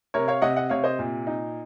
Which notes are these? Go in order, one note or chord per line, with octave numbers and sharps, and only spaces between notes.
C3 A#4 C#5
C#5 F5
C3 D#5 F#5
D#5 F#5
C3 C#5 F5
C5 D#5
A#2
D#4